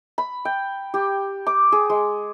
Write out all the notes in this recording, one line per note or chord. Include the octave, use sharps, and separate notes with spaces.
B5
G5
G4
D6
G#4
G#3